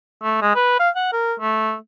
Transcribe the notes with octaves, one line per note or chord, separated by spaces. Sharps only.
A3
G#3
B4
F5
F#5
A#4
A3